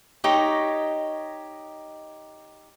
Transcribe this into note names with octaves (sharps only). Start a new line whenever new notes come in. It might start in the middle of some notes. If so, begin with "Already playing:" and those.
D#4 G4 C#5 D#5